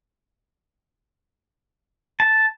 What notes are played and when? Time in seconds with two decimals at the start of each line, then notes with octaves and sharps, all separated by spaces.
2.20 A5